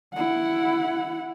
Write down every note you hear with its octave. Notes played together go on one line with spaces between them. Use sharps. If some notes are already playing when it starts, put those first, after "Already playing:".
E4 F#5